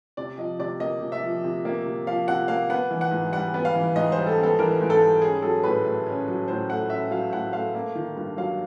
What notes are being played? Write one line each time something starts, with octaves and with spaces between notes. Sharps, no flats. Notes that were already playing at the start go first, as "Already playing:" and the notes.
C3 D5
F3 D#5
C3 D5
A#3 D#5
C3
E5
F3
C3
A#3
C3
F3 F5
C3 F#5
A#3 F5
B3 F#5
E3
F#5
G#2
G3 F#5
B3
F5
E3
G#2 D#5
C5
G3
A4
B3 A4
E3 A#4
G#2
A4
G3
C#4 G#4
F#3 A4
A2 B4
A3
C#4
F#3
A2 C5
A3 F#5
C#4 E5
F#3 F5
A2 F#5
A3 F5
A#3
D#3
G2
F#3 F5